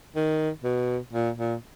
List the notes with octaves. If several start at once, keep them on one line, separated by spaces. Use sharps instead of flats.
D#3
B2
A#2
A#2